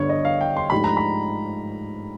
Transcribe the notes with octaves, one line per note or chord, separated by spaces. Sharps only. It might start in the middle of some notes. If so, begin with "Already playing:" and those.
Already playing: G1 G2 D3 C#5
D#5
F5
G5
C6
G#2 F3 A3 D4 G4 B5
A#5
B5